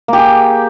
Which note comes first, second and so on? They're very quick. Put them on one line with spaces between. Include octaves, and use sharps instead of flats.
A#3 G4 G#4